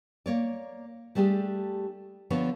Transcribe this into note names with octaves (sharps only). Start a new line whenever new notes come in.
A#3 C#5 D5
G3 A3 D4 G4 G#4
D3 F3 B3 C#5